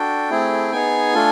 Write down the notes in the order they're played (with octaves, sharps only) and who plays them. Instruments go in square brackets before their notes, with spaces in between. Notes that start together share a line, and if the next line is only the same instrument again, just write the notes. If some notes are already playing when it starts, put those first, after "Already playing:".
Already playing: [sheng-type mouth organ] D4 F#4 A4 G5
A3 C4 E4 G#4
B3 D#4 G#4 G#5
A3 D4 F4 A4